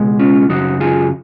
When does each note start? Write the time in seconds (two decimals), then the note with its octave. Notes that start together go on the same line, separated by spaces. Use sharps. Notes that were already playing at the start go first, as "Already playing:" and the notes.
Already playing: C#2 B2 G#3
0.19 C#4 F4
0.49 F#2 C#3 F#3 D#4 F#4
0.80 F4 G#4